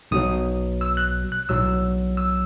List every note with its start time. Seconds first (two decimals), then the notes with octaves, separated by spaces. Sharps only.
0.11 B1 B2 F#3 D#6
0.81 E6
0.97 F#6
1.32 F#6
1.49 B1 A2 F#3 E6
2.17 E6